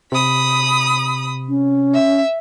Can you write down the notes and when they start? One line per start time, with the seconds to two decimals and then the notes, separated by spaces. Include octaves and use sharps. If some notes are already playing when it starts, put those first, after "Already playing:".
0.12 C3 B5 D#6
1.48 C#4
1.94 E5